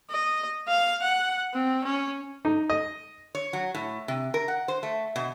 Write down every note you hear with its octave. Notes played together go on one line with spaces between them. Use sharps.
D#5
F5
F#5
C4
C#4
D#4
D#5
C#5
F#3
A2
C3
A#4
F#5
C5
A3
B2